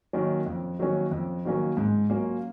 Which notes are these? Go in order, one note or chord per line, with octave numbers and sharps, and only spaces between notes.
D#3 F#3 A#3 C#4
F2
D#3 F#3 A#3 C#4
F2
D#3 F#3 A#3 C#4
G#2
F#3 A#3 C#4 F4